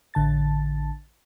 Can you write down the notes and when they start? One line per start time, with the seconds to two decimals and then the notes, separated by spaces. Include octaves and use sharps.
0.14 A1 D3 A5 A6